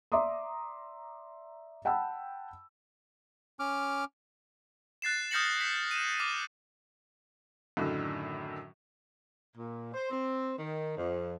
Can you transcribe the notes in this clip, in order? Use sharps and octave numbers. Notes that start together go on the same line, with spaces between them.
D5 E5 A#5 C6 D6 D#6
F#5 G5 A5 B5 E6
C#4 D6 F6
F#6 A6 C7 E7
D#6 F6 G6 A#6 C#7 F#7
B6
D#7 E7
D6 F6
F#2 A2 D3 D#3
A#2
C5
C4
D#3
F2